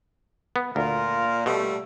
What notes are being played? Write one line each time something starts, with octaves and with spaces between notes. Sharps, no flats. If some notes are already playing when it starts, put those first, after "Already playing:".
B3
D2 A#2 F4 A#4
B2 G3 A3